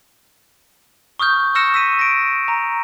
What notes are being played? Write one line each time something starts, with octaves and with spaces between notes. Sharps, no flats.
C#6 D#6 F6 G6
C#6 E6 F6 A#6 C#7 E7
E6 B6 D#7
A#6 D7
A#5